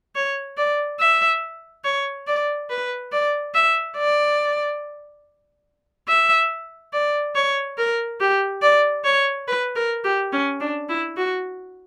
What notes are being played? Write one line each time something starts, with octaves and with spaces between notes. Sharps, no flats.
C#5
D5
E5
C#5
D5
B4
D5
E5
D5
E5
D5
C#5
A#4
G4
D5
C#5
B4
A#4
G4
C#4
D4
E4
F#4